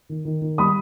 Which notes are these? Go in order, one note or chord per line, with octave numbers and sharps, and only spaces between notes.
D#3
D#3
D#3
G3 B5 D#6